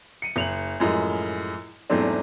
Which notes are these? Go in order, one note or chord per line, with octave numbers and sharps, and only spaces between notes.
C#7 D#7
F#1 F7 F#7
F#2 A2 F3 G#3
E2 G#2 F#3 A3 C4 D4